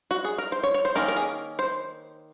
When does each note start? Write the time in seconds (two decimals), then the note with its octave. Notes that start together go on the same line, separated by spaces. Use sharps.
0.11 F#4
0.25 G#4
0.38 A#4
0.52 C5
0.63 C#5
0.74 C#5
0.85 C5
0.95 D#3 A#3 C#4 A#4
1.08 A#4
1.16 G#4
1.59 C5